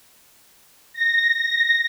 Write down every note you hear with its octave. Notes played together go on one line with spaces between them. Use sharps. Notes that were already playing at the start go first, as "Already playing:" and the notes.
A#6